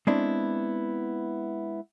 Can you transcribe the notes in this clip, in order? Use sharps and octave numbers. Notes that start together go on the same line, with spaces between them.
G#3 B3 C4 D4 E4